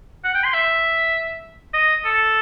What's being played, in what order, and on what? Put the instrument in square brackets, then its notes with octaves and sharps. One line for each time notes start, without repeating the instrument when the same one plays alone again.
[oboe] F#5
G5
C6
E5
D#5
A4